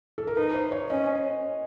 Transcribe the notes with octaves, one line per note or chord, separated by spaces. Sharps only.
A4
A#4
D#4 B4
C5
C#5
C#4 D#5